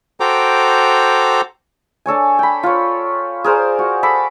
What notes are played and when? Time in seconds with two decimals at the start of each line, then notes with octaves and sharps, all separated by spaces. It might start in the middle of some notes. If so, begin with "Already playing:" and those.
0.20 F#4 A4 C5 G5 A#5 D6
2.06 D4 A4 C#5 G#5
2.39 G5 B5
2.63 F4 C#5
3.44 G#4 A#4 C5 D5
3.79 F#4
4.03 A4 B5 D6